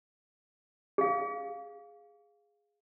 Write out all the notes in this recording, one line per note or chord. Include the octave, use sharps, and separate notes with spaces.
G#4 F5